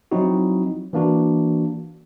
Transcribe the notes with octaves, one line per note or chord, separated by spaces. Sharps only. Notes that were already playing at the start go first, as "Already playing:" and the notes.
F3 F#3 C4 D#4 E4 F#4
E3 A#3 D4 F#4